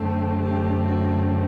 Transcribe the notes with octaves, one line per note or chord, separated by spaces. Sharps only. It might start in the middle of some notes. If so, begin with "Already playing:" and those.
Already playing: F#2 D3 A3 C4 A4
G4
F#4